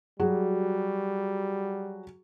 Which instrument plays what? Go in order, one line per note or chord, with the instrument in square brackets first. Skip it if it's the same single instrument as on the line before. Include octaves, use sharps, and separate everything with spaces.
[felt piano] F#3 F#4 G#4 [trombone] G3